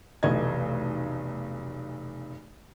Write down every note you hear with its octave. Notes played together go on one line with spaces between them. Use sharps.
F1 B1 E3 A3 D#5 G#6